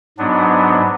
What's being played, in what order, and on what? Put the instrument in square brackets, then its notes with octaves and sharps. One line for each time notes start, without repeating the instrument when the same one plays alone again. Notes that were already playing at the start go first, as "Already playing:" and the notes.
[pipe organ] G#2 F#3 B3 D4